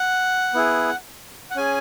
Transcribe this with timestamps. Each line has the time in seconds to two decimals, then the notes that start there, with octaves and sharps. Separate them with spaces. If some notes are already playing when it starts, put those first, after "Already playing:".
Already playing: F#5
0.54 B3 E4 G#4
1.51 F#5
1.56 C#4 G#4 G#5